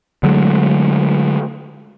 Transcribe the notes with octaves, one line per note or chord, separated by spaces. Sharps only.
D3 F#3 G#3 A3